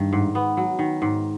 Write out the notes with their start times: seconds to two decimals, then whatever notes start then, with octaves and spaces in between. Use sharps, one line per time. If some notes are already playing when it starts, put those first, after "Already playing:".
Already playing: G2 D#3
0.13 G#2
0.35 B3
0.57 F#3
0.79 D#3
1.02 G#2